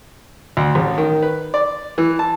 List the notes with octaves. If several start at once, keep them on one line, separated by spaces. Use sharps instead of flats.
D2
A1
D#3
B4
D5
E3
A5